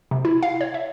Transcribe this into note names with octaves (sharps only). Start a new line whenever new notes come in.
C3
E4
F5
C#5
E5